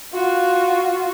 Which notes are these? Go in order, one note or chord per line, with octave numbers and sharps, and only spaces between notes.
F4 F#4